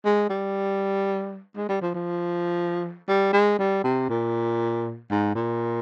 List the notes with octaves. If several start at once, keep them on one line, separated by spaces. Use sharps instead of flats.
G#3
G3
G#3
G3
F3
F3
G3
G#3
G3
C3
A#2
G#2
A#2